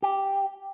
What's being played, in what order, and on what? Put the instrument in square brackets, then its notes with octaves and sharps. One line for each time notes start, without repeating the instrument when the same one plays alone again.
[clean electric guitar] G4